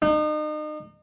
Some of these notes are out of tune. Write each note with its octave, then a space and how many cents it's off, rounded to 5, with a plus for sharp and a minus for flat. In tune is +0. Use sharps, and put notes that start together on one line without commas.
D#4 -35